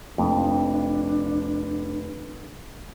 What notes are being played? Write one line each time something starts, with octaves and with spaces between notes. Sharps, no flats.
F1 F2 D4